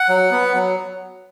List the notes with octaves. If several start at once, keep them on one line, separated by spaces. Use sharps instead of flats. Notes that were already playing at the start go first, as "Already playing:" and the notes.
Already playing: F#5
F#3
B3
F#3